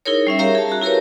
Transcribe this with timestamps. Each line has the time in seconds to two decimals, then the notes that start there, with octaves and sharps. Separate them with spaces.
0.06 D#4 E4 G#4 A#4 C#5
0.27 G3 C#4 E5
0.39 G4 A#4 C#5 E5 F5 A#5
0.55 G#4 A5
0.69 F#4 A#5
0.81 E4 G4 A#4 B4 C#5